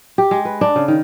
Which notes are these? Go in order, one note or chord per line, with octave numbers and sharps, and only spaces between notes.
G4
G#3
B4
D4
C#3
D#3